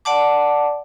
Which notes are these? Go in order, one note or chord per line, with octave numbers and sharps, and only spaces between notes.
D5 F#5 A5 D6